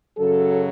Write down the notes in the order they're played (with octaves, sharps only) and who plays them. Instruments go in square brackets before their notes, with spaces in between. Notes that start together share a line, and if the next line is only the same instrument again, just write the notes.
[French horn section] F#2 C#3 F#3 A4